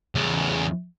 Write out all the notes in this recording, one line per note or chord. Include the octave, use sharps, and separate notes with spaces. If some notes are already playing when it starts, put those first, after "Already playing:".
E2 C#3